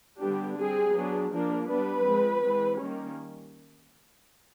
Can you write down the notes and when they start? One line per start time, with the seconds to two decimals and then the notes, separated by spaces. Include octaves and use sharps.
0.19 D3 G3 B3 D4 G4
0.57 G3 C4 G#4
0.93 F#3 B3 D4
1.32 F3 A#3 D4
1.68 G3 B3 D4 B4
2.06 F3 G#3 C4
2.43 E3 G#3 C4
2.79 D#3 G3 A#3 C#4